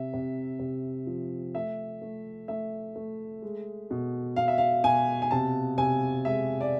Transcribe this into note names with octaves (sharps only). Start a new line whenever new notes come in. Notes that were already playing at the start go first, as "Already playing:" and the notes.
Already playing: C3 E5
C3
C3
F3
A3 E5
A3
A3 E5
A3
G#3
B2
B2 F5
E5
F5
B2 G#5
G#5
C3 A5
C3 G#5
G#3 E5
D5